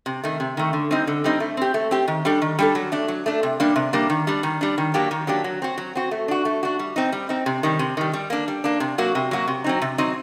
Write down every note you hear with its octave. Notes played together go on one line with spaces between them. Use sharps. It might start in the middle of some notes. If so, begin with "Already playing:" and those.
C3
D#3 A3
C3
D#3 A3
D3
G3 C4 D#4
D3
G3 C4 D#4
A3
C4 G4
A3
C4 G4
D#3
G3 D4 A4
D#3
G3 D4 A4
F#3
A3 D4
F#3
A3 D4
C3
G3 A#3 D4
C3
G3 A#3 D4
D#3
G3 D4
D#3
G3 D4
D#3
F#3 A#3 D4 G4
D#3
F#3 A#3 D4 G4
F#3
C4 F#4
F#3
C4 F#4
A3
D4 F#4
A3
D4 F#4
G3
C4 D#4
G3
C4 D#4
C3
D#3 G3
C3
D#3 G3
G3
A#3 D4
G3
A#3 D4
C3
F#3 A#3 F#4
C3
F#3 A#3 F#4
C3
F#3 C4 D#4
C3
F#3 C4 D#4